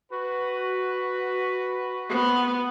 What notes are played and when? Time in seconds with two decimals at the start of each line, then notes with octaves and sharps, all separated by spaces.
0.12 F#4 B4
2.10 B3